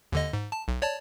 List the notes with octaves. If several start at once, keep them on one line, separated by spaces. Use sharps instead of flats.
D#2 D3 D#5
G#2
A5
B1
C#5 D5 A5